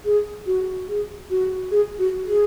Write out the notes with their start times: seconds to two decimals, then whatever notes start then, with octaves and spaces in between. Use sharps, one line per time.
0.05 G#4
0.46 F#4
0.89 G#4
1.30 F#4
1.71 G#4
1.99 F#4
2.27 G#4